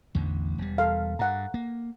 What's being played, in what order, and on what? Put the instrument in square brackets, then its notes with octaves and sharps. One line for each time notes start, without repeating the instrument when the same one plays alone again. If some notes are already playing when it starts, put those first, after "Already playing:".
[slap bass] A1 E2 D3
E1 G3
[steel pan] A4 F5
[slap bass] G2 [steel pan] F#5 A#5
[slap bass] A#3